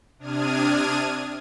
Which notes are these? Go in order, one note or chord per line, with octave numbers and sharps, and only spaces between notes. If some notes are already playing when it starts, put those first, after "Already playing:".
C3 D4 D#6 F6 G#6 D#7